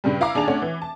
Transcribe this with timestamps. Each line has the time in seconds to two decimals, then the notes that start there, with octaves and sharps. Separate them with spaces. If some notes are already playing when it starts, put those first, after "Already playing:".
0.04 G2 C#3 G3
0.21 E4 F5 A#5 D6
0.35 D#2 D4 G#4 G#5 A5 F7
0.48 A3 C#4 D4 C#5 F#5
0.62 E3
0.82 A5